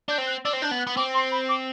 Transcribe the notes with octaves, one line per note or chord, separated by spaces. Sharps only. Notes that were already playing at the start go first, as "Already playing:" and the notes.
D4 G6
C4
F#6
D4 E6
C4
D4 G6
B3
F#6
B3
C4 D6
C6
B5
D6